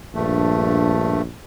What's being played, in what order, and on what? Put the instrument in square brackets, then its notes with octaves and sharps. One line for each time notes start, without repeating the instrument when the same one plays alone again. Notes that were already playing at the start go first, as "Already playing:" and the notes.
[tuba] A#1 [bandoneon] G2 A3